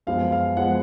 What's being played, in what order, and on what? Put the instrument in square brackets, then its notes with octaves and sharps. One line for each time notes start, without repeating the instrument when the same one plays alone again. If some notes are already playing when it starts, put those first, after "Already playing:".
[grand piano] F#2 F3 G#3 B3 F5
F5
F3 G#3 B3 F#5